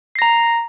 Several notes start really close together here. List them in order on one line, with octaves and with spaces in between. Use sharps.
C7 A#6 A#5